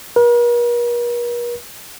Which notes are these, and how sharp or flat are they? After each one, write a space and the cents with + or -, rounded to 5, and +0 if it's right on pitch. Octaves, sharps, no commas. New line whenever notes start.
A#4 +45